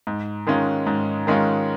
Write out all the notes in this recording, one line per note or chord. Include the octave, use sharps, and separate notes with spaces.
G#2
D#3 G#3 C#4 F4
G#2
D#3 G#3 C#4 F4